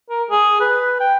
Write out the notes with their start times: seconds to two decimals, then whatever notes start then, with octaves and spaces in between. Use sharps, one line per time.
0.10 A#4
0.30 G#4
0.61 B4
1.00 G5